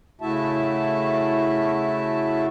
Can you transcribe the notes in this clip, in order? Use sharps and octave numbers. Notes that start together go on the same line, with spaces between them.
C#3 A3 E4 F#4 E5 A5